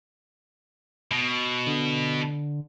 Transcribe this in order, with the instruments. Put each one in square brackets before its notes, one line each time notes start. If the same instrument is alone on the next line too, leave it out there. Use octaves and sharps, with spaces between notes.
[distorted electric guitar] B2
[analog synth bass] D3